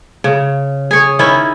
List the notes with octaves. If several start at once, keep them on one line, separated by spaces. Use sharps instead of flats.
C#3
G#4 C#5
D#3 C#4 E4